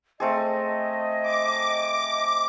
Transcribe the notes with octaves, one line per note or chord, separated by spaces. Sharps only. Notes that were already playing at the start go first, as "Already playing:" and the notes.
A3 C4 G#4 D#5
D6